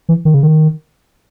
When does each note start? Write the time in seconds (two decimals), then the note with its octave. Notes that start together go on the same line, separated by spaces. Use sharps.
0.09 E3
0.25 D#3
0.34 C#3
0.43 D#3